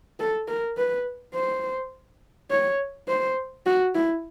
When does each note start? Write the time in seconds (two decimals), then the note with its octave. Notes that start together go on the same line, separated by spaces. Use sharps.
0.20 A4
0.48 A#4
0.77 B4
1.35 C5
2.51 C#5
3.08 C5
3.66 F#4
3.95 E4